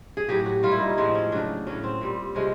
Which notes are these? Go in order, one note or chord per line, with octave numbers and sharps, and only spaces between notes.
G#4
A2 F#3 G4
F#4
A#2 G3 F4
E4
D#4
C#4
A2 F3 G#3 C4
C#4
C#3 F#3 D4
A2 F#3 C#4
C4
A#2 G3
C3 F3 G#3 C#4